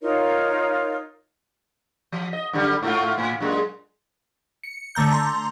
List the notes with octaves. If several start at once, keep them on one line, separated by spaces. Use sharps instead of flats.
D#4 F4 A#4 C#5
F3
D#5
F#2 D3 G3
G#2 A3 F4
A2
F#2 A#2 G#3
C#7
D3 A3 A#5 G6
A#5 C6